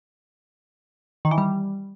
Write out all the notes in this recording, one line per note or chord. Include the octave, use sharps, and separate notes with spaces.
D#3
E3
G3